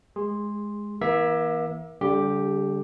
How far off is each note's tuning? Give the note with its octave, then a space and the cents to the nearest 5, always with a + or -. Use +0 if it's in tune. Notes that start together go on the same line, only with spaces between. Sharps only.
G#3 +0 G#4 -25 C6 +0
E3 -25 A#3 +40 E5 +0
D3 -35 G3 +10 G4 +0